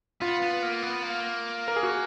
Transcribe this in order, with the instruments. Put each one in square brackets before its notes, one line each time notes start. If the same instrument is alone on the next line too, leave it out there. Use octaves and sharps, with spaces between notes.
[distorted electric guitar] B3 [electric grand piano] F4
[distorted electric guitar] B3
A#3
B3
A#3
[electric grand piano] A#4
G#4
F#4